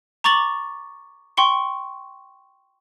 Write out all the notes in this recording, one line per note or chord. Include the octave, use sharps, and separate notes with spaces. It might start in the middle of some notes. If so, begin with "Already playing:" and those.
A#5 C#6 D6 A6 F#7
G5 C6 C#6 C#7